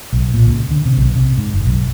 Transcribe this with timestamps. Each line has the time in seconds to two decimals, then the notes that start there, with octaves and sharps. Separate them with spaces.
0.13 B1
0.34 A#2
0.46 C#2
0.71 D3
0.86 C3
0.97 B1
1.15 C3
1.38 G#2
1.53 F#1
1.65 B1